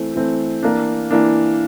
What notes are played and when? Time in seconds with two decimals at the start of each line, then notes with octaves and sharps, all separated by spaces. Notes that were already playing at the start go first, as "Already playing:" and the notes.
Already playing: E3 A3 C4
0.15 E3 A3 C4
0.63 E3 A#3 D4
1.11 E3 A#3 D4